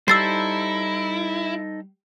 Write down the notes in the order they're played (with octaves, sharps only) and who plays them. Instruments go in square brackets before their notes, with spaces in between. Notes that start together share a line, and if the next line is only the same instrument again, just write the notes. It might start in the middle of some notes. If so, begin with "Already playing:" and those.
[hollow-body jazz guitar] G3 [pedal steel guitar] D#4 A4 C5 [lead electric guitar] E4 [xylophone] E6 A6 C7